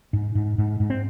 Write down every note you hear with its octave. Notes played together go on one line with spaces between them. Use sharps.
G#2
G#2
G#2
G#2
C4